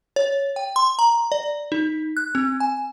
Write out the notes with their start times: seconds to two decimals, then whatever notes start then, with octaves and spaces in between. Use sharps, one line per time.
0.16 C#5
0.56 G5
0.76 C6
0.99 A#5
1.32 D5
1.72 D#4
2.17 F#6
2.35 C4
2.60 G#5